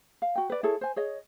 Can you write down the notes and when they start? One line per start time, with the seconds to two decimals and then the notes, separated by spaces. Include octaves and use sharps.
0.22 F5
0.36 F#4 G5
0.50 B4 D5
0.63 E4 G#4 A4 C#5
0.81 C5 G#5
0.96 G#4 C#5 D#5